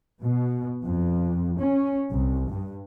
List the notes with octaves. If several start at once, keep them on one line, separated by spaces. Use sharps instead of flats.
B2
F2
C#4
C2
G2